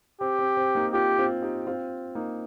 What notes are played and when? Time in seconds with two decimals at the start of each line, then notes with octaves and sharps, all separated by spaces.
0.21 C4 G4
0.39 C4
0.57 C4
0.75 A#3 D#4
0.93 C4 F4 G4
1.18 C4 F4
1.42 D#4 G4
1.67 C4 F4
2.15 A#3 D#4